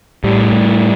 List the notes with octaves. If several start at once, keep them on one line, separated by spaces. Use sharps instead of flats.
A2 G3
A2